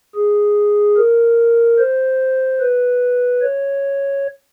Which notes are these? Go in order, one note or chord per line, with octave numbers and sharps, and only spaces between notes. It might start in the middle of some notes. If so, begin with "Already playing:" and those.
G#4
A#4
C5
B4
C#5